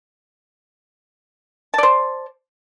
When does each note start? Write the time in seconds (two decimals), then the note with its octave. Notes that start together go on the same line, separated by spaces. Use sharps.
1.74 A5
1.78 D5
1.83 C5